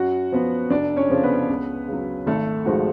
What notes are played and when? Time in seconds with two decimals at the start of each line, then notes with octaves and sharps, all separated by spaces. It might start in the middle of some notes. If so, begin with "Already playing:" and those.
Already playing: F#2 F#4 F#5
0.32 F3 B3
0.70 F1 D4 D5
0.96 C#4 C#5
1.10 F2 C#3 F3
1.23 B3 B4
1.49 C#2
1.88 C#3 F#3
2.27 G#1 A3 A4
2.65 G#2 F3 G#3 F#4